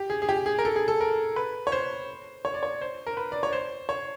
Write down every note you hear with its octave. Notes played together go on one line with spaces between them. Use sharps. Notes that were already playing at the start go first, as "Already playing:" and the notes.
Already playing: G4
G#4
G#4
G4
G#4
A#4
A4
G#4
A4
A#4
B4
C#5
C5
C#5
D5
C#5
C5
A#4
B4
D5
C#5
C5
C#5